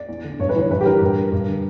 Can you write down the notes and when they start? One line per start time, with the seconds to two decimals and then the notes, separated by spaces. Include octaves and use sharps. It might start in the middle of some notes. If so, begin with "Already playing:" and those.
Already playing: D5
0.09 E2
0.24 D3
0.40 G2 C#5
0.49 B4
0.55 E3 C#5
0.70 G2 B4
0.81 G4
0.86 E3 A#4
1.01 G2
1.17 D3
1.32 G2
1.48 D3